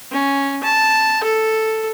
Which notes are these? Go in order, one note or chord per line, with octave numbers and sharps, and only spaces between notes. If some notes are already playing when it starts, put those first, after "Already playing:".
C#4
A5
A4